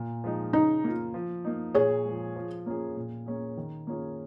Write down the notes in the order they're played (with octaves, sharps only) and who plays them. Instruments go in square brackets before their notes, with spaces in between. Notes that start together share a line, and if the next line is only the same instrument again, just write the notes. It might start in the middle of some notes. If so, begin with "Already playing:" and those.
Already playing: [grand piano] A#2
F3 G#3 D#4
[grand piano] C#3 [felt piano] D#4
[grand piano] A#3 F4
F3
A#3 D#4
[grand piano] A#2 [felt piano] G#4 C#5
[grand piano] F3 G#3
F3
A#3 C#4 F4 G#4
A#2
A#3 C#4 G#4
D#3
A#3 C#4 F4 G#4